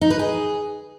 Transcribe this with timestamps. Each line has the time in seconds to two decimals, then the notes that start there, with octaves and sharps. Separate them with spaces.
0.01 D#4
0.10 B4
0.19 G#4